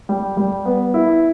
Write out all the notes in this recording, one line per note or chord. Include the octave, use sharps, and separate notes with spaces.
G3
G3
B3
E4